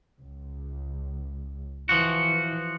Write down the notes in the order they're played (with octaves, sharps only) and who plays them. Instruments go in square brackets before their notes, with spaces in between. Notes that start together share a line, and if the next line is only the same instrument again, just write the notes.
[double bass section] C#2
[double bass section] E3 [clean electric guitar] F3 F#4